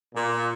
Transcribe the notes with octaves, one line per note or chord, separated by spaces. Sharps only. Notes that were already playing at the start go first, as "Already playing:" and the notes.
A#2